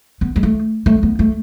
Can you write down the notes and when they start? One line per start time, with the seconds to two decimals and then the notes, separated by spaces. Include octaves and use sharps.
0.21 B3
0.36 G#3
0.43 A3
0.86 A3
1.03 B3
1.19 A3